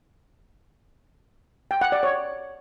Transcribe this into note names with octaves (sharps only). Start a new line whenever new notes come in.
G5
F#5
D5
C#5